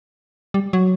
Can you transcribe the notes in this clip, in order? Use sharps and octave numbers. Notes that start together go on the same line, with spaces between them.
G3
F#3